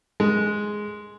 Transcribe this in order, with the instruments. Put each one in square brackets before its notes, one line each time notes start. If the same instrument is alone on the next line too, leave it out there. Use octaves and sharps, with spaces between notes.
[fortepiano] G#3